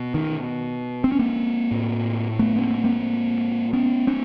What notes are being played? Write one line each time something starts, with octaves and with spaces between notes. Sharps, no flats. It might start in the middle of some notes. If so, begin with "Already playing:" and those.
Already playing: B2
D#3
C4
C#4
A#3 C4
A2
A3 B3
B3
A#3 C4
A#3 C4
B3 C#4
C4 D4